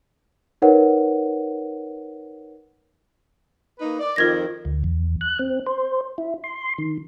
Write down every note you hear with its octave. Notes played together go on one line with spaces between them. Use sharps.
D#4 A#4 B4 C#5 F#5
A#3 D#4 B4
D5
F2 D#3 F4 G#6 A#6
D2
E2
F#6
C4
C5
E4
C6
D#3